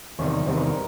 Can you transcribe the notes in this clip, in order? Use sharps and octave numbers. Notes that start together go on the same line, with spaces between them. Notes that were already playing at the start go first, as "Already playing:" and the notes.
E2 C3 D#3 G3 C#5
E2 C3 D#3 G3 C5
B4
A#4